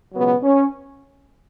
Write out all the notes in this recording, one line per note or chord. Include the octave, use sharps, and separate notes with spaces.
C#2 B2 F#3 B3
C#4